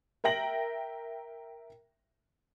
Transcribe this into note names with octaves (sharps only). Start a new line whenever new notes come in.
A#4 E5 G5 A#6 F#7